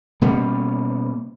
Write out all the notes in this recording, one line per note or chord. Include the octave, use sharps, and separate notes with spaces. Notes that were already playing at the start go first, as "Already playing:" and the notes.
B2 G3 A#3 C#4